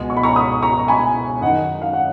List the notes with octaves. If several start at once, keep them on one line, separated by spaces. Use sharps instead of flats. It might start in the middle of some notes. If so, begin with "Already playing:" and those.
Already playing: C#2 B2 G#3 B3 G#5
C#6
B5
A#5 C#6
B5 D#6
A#5 C#6
A#5
G#5 B5
F#2 D#3 G#3 D#4 D#5 F#5
F5
F#5